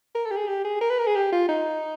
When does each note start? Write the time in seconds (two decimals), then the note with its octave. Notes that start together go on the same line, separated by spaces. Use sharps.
0.15 A#4
0.26 A4
0.31 G4
0.37 G#4
0.48 G4
0.65 G#4
0.81 A#4
0.90 B4
0.99 A#4
1.07 G#4
1.16 G4
1.33 F4
1.48 D#4